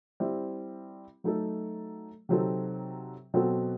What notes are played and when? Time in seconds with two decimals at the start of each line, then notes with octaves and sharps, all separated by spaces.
0.20 G3 C4 E4
1.24 F#3 A3 D#4 A4
2.29 C3 F#3 C4 D#4 A4
3.34 B2 F#3 C4 F#4 A4